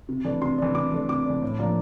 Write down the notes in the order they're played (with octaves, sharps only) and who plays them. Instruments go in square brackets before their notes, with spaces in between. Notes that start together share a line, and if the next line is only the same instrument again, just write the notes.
[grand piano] C3
E3 A3 D4
C3 C6
E3 A3 D4
C3 D6
E3 A3 D4
C3 D6
E3 A3 D4
A2
F3 A#3 D4